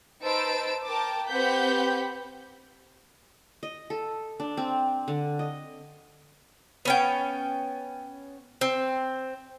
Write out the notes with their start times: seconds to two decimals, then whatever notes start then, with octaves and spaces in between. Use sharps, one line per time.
0.21 D#4 B4 C5 A5 E6 D7
0.85 A#4 G5 A5 D6
1.28 C4 G4 B4 F#5 G6 B6
3.63 D#5
3.90 A4
4.40 D4
4.57 C4
5.08 D3
5.39 D#5
6.85 B3 C#4 G5
8.61 C4